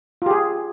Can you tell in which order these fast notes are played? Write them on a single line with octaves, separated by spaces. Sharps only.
F4 G4 G#4